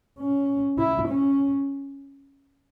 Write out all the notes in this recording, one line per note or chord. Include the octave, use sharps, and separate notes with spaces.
C#4
E4
C#4